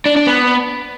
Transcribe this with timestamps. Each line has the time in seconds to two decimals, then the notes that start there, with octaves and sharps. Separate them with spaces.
0.06 D4
0.16 D4
0.27 B3